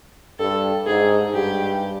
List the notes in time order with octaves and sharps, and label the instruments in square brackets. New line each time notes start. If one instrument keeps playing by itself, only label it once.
[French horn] G2 [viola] A4
[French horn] G#2 [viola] G#4
[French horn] G2 [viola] G4